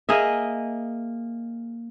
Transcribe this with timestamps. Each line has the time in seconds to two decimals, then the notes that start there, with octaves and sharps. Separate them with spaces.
0.09 A#3 G#4 D#5 E5